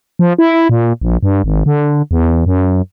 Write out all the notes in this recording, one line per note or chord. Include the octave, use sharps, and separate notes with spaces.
F3
E4
A#2
A#1
G2
G#1
D3
E2
F#2